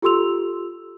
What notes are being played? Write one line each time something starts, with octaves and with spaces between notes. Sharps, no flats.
F4 G4 A4 C6 E6 F7